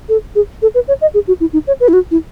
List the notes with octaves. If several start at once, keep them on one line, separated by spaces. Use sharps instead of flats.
A4
G#4
A4
B4
C#5
D#5
G#4
F#4
E4
D#4
C#5
B4
E4
F#4
E4